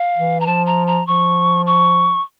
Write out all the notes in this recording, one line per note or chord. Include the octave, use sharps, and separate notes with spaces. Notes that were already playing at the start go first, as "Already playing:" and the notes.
Already playing: F5
E3
A#5
F3 A5
A#5
A#5
F3 C#6
C#6